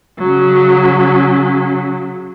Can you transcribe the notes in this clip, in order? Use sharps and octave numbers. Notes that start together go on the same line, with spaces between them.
C#3 F#3